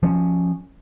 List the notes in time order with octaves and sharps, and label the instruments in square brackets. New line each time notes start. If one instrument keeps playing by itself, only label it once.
[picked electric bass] F3 C#4